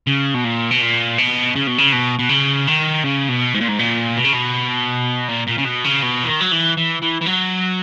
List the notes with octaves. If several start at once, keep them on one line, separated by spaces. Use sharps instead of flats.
C#3
B2
A#2
B2
A#2
B2
C#3
B2
C#3
B2
B2
C#3
D#3
C#3
B2
G#2
A#2
G#2
A#2
B2
C#3
B2
A#2
A#2
C#3
B2
C#3
B2
E3
D#3
F#3
E3
E3
E3
E3
F#3